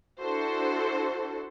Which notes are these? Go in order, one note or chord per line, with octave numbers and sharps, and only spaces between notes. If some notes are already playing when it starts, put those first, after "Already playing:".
D4 E4 F#4 A4 C5